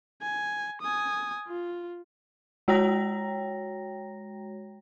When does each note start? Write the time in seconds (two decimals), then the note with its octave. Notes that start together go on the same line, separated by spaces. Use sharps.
0.22 G#5
0.81 G#5 D#6
1.48 F4
2.68 G#3 F#4 C#5 G5 A#5 A#6